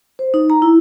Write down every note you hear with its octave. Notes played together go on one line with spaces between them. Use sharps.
C5
D#4
A#5
E4